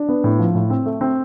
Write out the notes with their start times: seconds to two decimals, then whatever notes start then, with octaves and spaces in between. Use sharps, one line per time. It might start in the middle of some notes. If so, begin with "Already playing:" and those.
Already playing: D4
0.09 B3
0.24 A2
0.39 F3
0.55 A2
0.70 C4
0.86 A3
1.01 C4